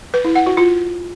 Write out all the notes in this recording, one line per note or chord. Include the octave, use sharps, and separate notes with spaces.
B4
E4
F#5
F#4
F4